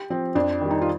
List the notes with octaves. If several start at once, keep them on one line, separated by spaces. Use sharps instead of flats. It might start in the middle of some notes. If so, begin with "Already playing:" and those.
Already playing: G4
F3 C4
F2 D4
D#3 G3
D#4
F4